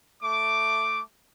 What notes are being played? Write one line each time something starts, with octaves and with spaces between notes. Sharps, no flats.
A3 D6